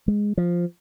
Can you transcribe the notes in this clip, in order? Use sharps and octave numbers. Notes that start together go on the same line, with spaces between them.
G#3
F3